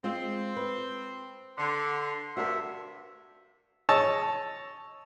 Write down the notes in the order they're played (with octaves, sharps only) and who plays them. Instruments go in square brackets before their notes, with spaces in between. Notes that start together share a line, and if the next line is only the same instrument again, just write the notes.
[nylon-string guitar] G#3 F4 D#5 [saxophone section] C4
[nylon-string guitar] B4
[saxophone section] D3 [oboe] C6
[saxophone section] G2 C3 [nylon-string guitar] F#4 A#4 [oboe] E5
[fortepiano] C#5 D#5 A5 E6